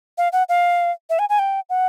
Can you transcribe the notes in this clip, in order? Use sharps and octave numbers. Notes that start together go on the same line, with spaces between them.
F5
F#5
F5
E5
G#5
G#5
G5
F#5